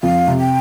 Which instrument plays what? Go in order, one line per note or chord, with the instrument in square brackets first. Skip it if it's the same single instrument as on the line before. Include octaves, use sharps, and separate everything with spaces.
[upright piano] F2 [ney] F5
[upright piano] C3
[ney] G5